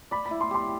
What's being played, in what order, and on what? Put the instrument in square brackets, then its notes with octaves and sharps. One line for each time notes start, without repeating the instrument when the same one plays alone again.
[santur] D5 [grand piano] B5
[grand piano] B5
[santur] E4
[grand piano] C6
[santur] G4 [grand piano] C6